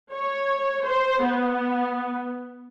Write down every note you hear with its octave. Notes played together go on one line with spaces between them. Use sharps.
C#5
C5
B3